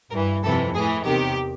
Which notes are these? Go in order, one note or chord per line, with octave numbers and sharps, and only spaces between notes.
G2 E3 A#4
F2 C3 E3 A4
A2 E3 G#4
E2 C3 D#3 G4